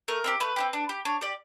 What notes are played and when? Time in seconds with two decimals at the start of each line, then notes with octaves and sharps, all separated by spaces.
0.08 A3 A#4
0.24 C4 D#4 G4
0.40 A3 B4
0.56 C4 D#4 G4
0.73 D4
0.89 G4
1.05 D4 C#5
1.21 G4 D5